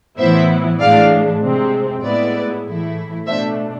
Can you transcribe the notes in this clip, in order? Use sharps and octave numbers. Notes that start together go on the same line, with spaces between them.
A2 E3 B3 E4 C5 E5
A2 E3 G#3 D4 D5 F5
C3 G#3 C4
A2 G#3 B3 E4 B4 D5
A2 E3 A3 E4
B2 A3 D4 C5 E5